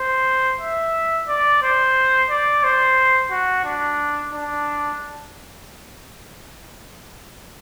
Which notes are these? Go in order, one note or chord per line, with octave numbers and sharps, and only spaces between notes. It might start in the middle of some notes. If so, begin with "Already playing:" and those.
Already playing: C5
E5
D5
C5
D5
C5
F#4
D4
D4